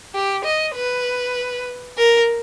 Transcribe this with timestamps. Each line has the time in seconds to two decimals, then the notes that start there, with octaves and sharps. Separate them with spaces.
0.15 G4
0.45 D#5
0.76 B4
1.98 A#4